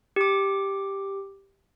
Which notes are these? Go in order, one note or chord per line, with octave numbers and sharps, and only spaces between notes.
G4 D6